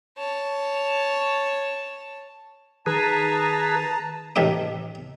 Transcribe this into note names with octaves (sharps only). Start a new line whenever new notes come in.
C#5 A5
D#3 G#4 B4 A5 A#5
A1 A2 D#3 G4 E5 D6